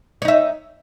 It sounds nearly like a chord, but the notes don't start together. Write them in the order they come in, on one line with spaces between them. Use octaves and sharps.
C#5 D#4 E5